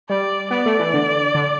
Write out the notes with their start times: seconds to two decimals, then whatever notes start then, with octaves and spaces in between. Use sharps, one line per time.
0.10 G3 D5
0.51 B3 D5
0.66 A3
0.79 E3
0.94 D3
1.35 D3